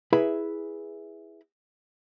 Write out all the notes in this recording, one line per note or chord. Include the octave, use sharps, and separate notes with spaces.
E4 G#4 B4 E5 A#5 B5